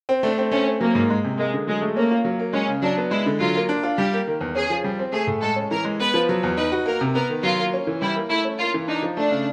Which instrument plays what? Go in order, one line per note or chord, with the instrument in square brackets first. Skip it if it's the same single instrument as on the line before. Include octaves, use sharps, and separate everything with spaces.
[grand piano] C4
[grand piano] A3 [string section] D4
[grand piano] C4
[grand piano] A3 [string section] C#4
[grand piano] C4
[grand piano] F#3 [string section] A#3
[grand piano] G#2
G#3
C3
[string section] G#3 [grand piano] A#3
[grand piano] D3
[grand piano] F#3 [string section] G#3
[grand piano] A3
[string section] A#3 [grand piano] C#4
[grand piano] F4
F#3
A#3
[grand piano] G#3 [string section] C#4
[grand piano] C#3
[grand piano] F#3 [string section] D4
[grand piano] B3
[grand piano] G#3 [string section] E4
[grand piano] D3
[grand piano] F#3 [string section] F4
[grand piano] A#3
D4
F4
[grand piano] G3 [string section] G4
[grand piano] A#3
D#3
E2
[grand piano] C#4 [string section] G#4
[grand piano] F3
G3
C4
[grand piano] A3 [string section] G#4
[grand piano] A2
[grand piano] G#3 [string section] A4
[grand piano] C#4
[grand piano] E3 [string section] A#4
[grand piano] G#3
[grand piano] B3 [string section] B4
[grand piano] F3
F#3
E2
[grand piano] D#4 [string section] B4
[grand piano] F#4
[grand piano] A#3 [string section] A#4
[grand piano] C3
[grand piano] B3 [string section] A#4
[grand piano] D#3
[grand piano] F#3 [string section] F4
[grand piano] A#3
C#4
E3
[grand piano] G3 [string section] E4
[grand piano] A#3
[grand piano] A3 [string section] E4
[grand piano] C#4
[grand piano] A#3 [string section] F4
[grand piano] E3
[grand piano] D4 [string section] D#4
[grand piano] F3
[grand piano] A3 [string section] D4
[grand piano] C#3